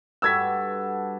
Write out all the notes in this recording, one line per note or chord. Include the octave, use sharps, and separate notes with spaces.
G2 F#4 A4 E6 G#6 B6